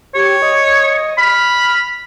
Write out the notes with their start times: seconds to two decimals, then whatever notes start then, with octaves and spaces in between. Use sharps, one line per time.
0.15 G4 C#5
0.42 D#5
1.18 B5 F6